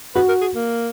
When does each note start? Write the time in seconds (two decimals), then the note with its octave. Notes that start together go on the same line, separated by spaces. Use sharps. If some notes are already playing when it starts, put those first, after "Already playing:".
0.15 F#4 B4
0.28 A#4
0.41 G#4
0.55 A#3